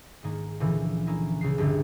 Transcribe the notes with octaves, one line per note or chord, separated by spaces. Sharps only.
G#2 D#3 A#3 D#4
C#2 A#2 D3 E3 F3
A#3 C#4 D#4 E4
C#2 C#3 C7
G1 C#2 D3 E3